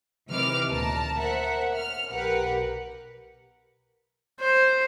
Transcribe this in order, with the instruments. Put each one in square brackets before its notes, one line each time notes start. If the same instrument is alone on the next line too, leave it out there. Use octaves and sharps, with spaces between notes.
[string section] C3 D#3 E3 B4 D6 F6
D2 A#2 A5 A#5
A#4 C5 E5 F#5
F6
B1 G4 A#4 B4 F#5
[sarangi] C5